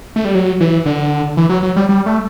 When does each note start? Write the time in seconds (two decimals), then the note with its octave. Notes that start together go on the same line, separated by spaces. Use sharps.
0.16 A3
0.25 G3
0.35 F#3
0.60 E3
0.86 D3
1.37 E3
1.49 F#3
1.63 F#3
1.76 G3
1.89 G3
2.06 A3